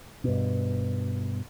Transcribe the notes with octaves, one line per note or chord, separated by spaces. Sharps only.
G2 B2